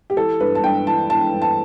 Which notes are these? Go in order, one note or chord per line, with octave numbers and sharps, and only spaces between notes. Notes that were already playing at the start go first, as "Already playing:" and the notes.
G4
E3 A4
G2 B4
A5
G2 G5
E3 A5
E3 A5
G2
A5